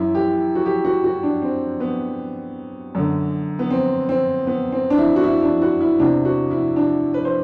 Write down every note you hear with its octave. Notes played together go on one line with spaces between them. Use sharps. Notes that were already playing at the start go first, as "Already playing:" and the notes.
Already playing: F#2 E3 E4
G4
F#4
G4
F#4
F#4
D4
C4
B3
F#2 D3
B3
C4
C4
B3
C4
D4
E4
F#4
E4
D4
F#4
E4
E2 C3 E3 D4
F#4
E4
D4
B4
C5